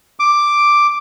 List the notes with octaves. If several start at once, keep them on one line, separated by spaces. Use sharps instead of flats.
D6